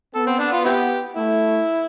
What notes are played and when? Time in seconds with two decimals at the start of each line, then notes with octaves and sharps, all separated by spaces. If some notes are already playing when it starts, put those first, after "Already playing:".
0.15 B3 A4
0.27 C4
0.39 D4
0.52 F4
0.65 C4 E4 G4
1.15 A3 E4